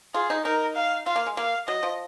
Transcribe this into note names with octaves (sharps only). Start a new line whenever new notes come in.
F4 G#4
D#4
D#4 A#4
F5
F4 F5
A#3
G#3
A#3 F5
F#3 D#5
F3